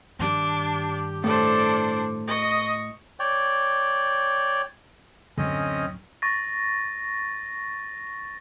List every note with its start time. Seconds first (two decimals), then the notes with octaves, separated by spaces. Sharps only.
0.19 G2 D#3 D4 G4
1.24 A2 D4 A4 C5 D5
2.28 D#5 C#6
3.20 C#5 D5 G5
5.38 D1 F#2 D3 C4 C#4 D#5
6.22 C#6 A6 A#6